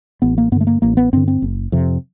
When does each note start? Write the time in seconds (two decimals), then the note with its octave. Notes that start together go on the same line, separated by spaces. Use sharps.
0.22 A1 B3
0.38 A#3
0.52 G2 B3
0.56 D3 A3
0.67 A#3
0.82 A1 A#3
0.97 B3
1.13 G2 D3 C4
1.28 C4
1.42 F#1
1.72 F2 C3